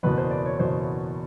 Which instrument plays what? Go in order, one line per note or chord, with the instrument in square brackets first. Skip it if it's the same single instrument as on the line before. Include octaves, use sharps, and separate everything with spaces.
[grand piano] F#1 E2 B2 B4
C5
D5
C#5
F#1 E2 B2 C5